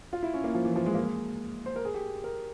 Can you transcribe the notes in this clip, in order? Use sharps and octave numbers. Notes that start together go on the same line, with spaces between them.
F4
E4
C#4
A#3
F3
E3
F3
G#3
A#3
G#3
C5
A#4
G#4
G4
A#4